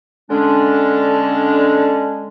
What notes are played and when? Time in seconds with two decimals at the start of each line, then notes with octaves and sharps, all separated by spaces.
0.30 D3 G#3 C#4 D4